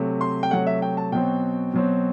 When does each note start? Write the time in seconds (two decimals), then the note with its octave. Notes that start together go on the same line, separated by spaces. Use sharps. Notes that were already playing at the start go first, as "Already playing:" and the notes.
Already playing: C3 F#3 A3
0.21 C6
0.43 G5
0.51 C3 F#3 A3 F#5
0.67 E5
0.82 G5
0.97 A5
1.12 B2 F#3 C4 G5
1.74 B2 F#3 C4